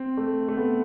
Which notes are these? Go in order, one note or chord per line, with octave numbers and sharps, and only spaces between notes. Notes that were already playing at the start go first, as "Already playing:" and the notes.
Already playing: C4
A3
A3
B3